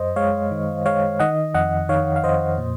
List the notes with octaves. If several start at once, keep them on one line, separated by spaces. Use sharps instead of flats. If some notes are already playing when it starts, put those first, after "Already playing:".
Already playing: F#2 C5 D#5
G#3 C#5 F5
D#3
G#3 C#5 F5
D#3 D#5 F#5
F2 D#5 F#5
D#3 C#5 F5
F5
F2 C5 D#5
A#2